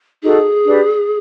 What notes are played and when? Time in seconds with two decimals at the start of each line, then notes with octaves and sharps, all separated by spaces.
0.23 D#4 F#4 G#4 A4
0.65 D4 G4 B4 D5